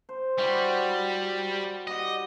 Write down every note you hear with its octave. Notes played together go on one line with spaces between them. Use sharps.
C5
G3 E4 F#4
G3 G4 D#5 F#5